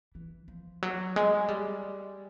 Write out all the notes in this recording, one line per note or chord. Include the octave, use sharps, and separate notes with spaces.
E3
F3
F#3
G#3
G3